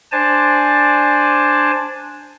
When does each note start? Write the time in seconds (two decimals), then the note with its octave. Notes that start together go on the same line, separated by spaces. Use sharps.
0.12 D4 C5 D5 G#5 A5